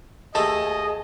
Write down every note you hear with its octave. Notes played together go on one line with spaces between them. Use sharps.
D#2 A3 D#4 G#4 D#5 A5